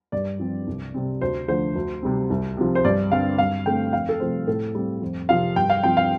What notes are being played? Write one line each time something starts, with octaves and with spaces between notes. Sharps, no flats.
G2 D5
F3 C4
C2
C3 G3 C4
D2 C5
D3 F3 A3 C5
D2
C3 G3 C4
C2
C3 F3
C5
G2 D5
D3 G3 C4 F5
G2 F5
D3 A3 C4 G5
F2 F5
A4
C3 F3 A3 C4 C5
A2 A4
G3 C4
F2
C3 F3 C4 F5
G2 G5
F5
F3 C4 G5
F5